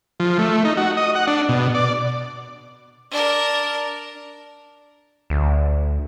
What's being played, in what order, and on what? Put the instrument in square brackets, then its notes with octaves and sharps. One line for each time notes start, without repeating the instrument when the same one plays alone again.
[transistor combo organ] F3
A3
D#4
F#4
D#5
F#5
D4
B2
D5
[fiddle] D4 A#4
[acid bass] D2